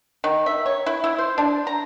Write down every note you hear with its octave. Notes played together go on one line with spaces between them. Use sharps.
D#3
E5
C#5
E4
E4
C5
D4
A#5